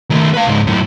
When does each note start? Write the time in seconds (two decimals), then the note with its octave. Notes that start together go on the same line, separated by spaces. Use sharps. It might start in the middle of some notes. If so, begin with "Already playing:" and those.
0.10 D#3 A3
0.34 B4 F5
0.47 C#2 G#2
0.67 F#2 A2